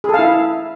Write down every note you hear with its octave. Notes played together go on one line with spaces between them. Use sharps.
E4 G#4 A4 F5